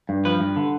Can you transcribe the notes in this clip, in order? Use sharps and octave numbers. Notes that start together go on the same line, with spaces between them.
G2
F3 B4
G2
D3